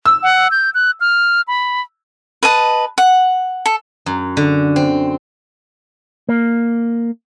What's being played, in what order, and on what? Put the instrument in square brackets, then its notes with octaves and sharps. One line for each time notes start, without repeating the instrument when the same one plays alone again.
[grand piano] E6
[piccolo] F#5
G6
F#6
F6
B5
[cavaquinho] B4 D#5 A5
F#5
A4
[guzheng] F#2
D3
C4
[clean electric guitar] A#3